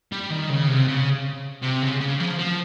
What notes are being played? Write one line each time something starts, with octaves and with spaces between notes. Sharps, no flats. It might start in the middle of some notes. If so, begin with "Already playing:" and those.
G3
D#3
C#3
C3
C#3
C3
C#3
C#3
F3
F3